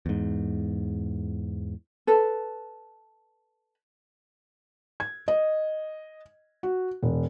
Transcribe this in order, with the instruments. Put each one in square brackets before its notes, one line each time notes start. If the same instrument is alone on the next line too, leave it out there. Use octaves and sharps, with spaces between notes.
[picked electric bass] E2 G#2
[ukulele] A4 B4
[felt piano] G#6
D#5
F#4
E1